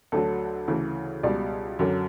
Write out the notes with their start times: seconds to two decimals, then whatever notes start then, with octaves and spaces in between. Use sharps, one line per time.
0.12 D2 D3 F#3 A4
0.68 D2 C#3 E3
1.23 C#2 B2 G3 D5
1.79 F#2 D3 F#3